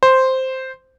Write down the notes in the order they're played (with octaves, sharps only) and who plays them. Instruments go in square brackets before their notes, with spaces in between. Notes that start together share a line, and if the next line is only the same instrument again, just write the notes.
[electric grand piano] C5